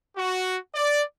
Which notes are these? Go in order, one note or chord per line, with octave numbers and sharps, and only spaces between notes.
F#4
D5